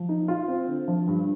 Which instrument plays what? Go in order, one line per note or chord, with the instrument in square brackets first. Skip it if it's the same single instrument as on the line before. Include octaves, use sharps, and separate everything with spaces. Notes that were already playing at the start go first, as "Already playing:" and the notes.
Already playing: [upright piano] F3
D#4
F4
C4
D3
F3
G2